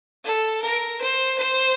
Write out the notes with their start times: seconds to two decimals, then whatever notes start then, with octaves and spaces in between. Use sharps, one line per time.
0.24 A4
0.62 A#4
1.01 C5
1.38 C5